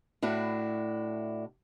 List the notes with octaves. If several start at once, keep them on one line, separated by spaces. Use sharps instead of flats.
A2 D4 E4 F#4